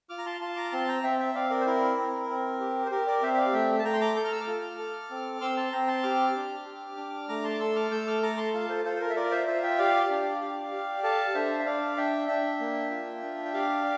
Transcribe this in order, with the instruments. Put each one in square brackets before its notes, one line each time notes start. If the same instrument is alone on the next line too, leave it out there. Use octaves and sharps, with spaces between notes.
[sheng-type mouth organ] F4 D6 F6
A#5
A5 C6
F4 A5 C6
A#5 D6
C4 A5 C6
G5 A#5
C4 E5 G5
E5 G5
C4 D5 F5
A#4 D5
C5
E4 A#4
C4
C4
G4
C5
G4 A#4
A#4 D5
C4 C5 E5
E5
D5 F5
A3 E5 G5
A5
A3 G5 A#5
C6
A#5 D6
A4 G6
F6
E6
D6 F6
F4
A4
C4
C4 C6 E6
A5 C6
C4 G5 A#5
A5 C6
G4 D6 F6
D4
G4
D4
A3 A#5 D6
A5 C6
D6
A4 C6 E6
D6 F6
A3 E6 G6
D6 F6
A4 A#5 D6
A5 C6
F4 F5 A5
A4 C5
F4 A4 C5
C5
A#4
E5
F4 A#4 D5
C5 E5
F4 C5 E5
E5 G5
G4 D5 F5
D4
G4
G4
A4 F5 A5
D4 C5 E5
E5
D4 D5 F5
D4 E5 G5
D4 E5 G5
A#3
F4
D4
G5
G4 D5 F5